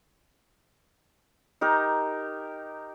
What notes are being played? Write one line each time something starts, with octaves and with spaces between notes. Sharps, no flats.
D#4 G4 A#4